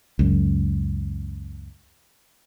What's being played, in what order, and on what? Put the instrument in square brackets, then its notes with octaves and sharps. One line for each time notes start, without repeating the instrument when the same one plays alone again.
[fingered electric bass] C#2 F#2